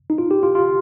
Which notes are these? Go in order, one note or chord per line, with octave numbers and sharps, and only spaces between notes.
D#4
F4
G4
F4
F4